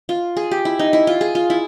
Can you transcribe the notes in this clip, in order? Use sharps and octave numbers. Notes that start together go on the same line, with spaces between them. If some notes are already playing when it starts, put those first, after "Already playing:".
F4
G#4
G4
E4
D#4
E4
F4
G#4
F4
E4